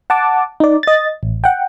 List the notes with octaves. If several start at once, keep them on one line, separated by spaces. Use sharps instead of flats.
F#5 A5 D6
D#4 D5
D#5 A6
A1
F#5 G5